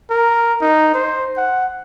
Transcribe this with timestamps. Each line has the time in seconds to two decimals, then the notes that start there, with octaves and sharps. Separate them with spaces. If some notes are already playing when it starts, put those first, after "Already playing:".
0.11 A#4
0.61 D#4
0.94 C5
1.37 F#5